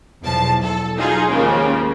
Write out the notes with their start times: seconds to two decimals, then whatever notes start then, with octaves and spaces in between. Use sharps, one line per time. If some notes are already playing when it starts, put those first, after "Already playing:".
0.22 B1 E2 F3 A5
0.63 A4
0.97 F#3 D#4 F4 G#4
1.27 D#2 C#3 F3 G#3 A#3